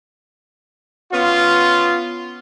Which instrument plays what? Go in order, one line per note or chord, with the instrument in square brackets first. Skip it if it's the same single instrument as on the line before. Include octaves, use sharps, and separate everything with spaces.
[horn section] B3 C#4 F4